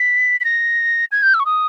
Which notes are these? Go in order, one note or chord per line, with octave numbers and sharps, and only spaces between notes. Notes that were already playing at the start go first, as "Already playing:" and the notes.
Already playing: B6
B6
A#6
G#6
G6
E6
C#6
D#6